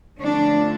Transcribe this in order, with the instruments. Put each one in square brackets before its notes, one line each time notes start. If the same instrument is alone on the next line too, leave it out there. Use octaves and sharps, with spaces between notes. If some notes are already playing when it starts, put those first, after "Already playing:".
[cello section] D3 F3 A3 D4